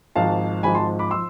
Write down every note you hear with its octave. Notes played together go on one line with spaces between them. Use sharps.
G#1 G#2 F3 F5 A5
G#1 G#2 F3 G#5 B5
A5 C6
B5 D6
F3 C6 E6